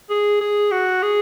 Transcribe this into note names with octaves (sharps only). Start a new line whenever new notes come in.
G#4
G#4
F#4
G#4